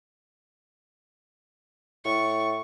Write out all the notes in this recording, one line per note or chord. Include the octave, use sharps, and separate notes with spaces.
A2 C#6